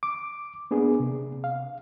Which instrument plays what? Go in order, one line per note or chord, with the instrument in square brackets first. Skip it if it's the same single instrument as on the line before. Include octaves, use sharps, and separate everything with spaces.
[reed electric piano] D6
A#3 B3 D4 G#4
C3
F5